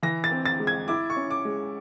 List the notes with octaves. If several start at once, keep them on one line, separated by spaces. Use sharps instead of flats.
E3 A#6
A6
C4
A6
G#3
G#6
E4 D6
C#6
C#4
D6
G#3